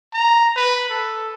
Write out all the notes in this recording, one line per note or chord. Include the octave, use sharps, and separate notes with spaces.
A#5
B4
A4